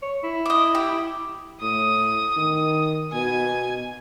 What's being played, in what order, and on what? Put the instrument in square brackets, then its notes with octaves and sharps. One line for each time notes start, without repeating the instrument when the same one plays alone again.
[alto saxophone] C#5
E4
[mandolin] D#5 D6
G4
[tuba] A2 [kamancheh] D#6
[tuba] D#3
[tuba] B2 [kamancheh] G#5